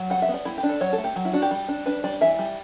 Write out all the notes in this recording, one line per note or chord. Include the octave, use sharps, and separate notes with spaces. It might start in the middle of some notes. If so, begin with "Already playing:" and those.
Already playing: F#3
G3 F#5
E5
B3
D5
G3 E4
G4
D4
A4
F#3 C#5
A4
A3
G4
F#3
E4
D4 F#4
G4
G3
D4
D4 B4
G3 D5
E3 E5
G3